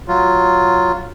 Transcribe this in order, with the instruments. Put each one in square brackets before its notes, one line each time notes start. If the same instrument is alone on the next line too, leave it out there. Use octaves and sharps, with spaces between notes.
[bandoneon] F#3 F4